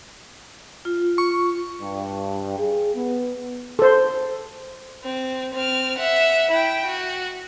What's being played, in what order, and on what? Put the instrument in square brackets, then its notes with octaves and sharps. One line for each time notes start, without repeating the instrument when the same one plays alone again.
[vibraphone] F4
[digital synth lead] C#6
[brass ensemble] G2
G#4
B3
[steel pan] A4 C5
[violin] C4
C4 F6
E5 F#5
E4 G5
F#4